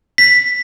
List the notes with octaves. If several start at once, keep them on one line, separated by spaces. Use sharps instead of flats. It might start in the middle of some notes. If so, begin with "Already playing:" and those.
B6